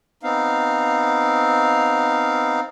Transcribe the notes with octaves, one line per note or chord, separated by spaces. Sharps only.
B3 C4 D#4 F5